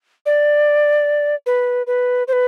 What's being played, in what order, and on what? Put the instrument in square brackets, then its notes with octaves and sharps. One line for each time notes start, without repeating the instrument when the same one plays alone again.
[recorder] D5
B4
B4
C5
B4